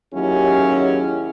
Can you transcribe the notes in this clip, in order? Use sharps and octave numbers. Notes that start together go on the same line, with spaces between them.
D#2 F#3 C#4 E4 G4 G#4